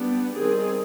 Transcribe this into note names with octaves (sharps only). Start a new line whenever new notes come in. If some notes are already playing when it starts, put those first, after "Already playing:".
Already playing: G3 B3 D4
D#3 G3 C4 G#4